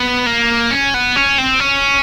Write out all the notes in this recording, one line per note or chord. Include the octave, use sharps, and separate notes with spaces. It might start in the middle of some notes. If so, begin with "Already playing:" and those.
Already playing: B3
A#3
C#4
B3
C#4
C4
C#4